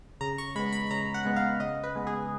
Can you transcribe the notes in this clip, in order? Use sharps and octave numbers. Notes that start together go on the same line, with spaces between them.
C#3 A#5
C#6
G#3 B3 B5
B5
C#3 A#5
F#5
G#3 B3
F5
C#3 D#5
B4
G#3 B3
G#4